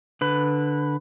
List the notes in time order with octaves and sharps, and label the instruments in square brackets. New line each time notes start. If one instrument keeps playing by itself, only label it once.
[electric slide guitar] D3 B4